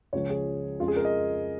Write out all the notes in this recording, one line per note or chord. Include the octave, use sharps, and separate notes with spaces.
C#2 C#3 F3 G#3 C#5
G#4
F2 C#3 G#3 F4
G#4
A#4
D#5